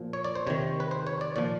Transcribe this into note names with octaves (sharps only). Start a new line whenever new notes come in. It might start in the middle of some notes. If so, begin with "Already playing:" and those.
Already playing: A#2 F3
C#5
D5
C5
C3 D#3 C#5
B4
C5
C#5
D5
A#2 F3 D5